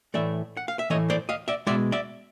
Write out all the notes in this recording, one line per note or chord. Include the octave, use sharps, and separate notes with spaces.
A2 E3 A3 D5 E5
F#5
F5
E5
A2 E3 A3 C#5 D#5
C5 D5
D#5 F5
D5 E5
B2 G#3 D5 E5
D5 E5